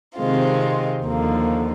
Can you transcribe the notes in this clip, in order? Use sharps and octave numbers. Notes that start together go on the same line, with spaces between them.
C3 D#3 G#3 C4 F4
D#2 D3 F3 A#3